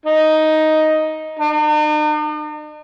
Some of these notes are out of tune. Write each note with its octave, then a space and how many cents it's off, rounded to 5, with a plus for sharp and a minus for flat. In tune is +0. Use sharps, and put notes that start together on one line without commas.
D#4 +5
D#4 -45